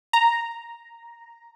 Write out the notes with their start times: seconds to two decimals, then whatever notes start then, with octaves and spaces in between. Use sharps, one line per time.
0.13 A#5